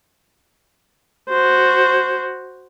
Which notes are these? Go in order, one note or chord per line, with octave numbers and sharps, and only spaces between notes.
F#4 C5